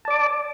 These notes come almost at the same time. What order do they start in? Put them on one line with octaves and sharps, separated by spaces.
A5 D5 D6